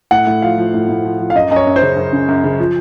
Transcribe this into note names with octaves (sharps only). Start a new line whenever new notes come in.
A2 F#5
A2
F3 F5
F3
A2
A2
F3
F3
F5
F#2 D#5
F#2 D#5
C#5
F#2
C5
C#3
F#2
C#3
F#2
C#3
F3